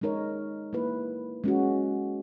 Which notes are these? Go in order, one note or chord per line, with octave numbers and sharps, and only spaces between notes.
G#3 D#4 A#4 C#5
A#3 E4 B4
G#3 C#4 F#4